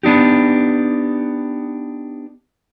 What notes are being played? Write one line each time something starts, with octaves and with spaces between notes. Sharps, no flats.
B3 D4 D#4 G4